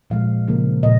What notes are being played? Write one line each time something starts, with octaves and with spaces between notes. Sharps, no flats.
A#2 F3 G#3 F5
C#3 F3 A#3
A#2 D#5